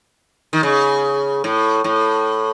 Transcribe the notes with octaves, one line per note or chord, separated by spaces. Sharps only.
D#3
C#3
A2
A2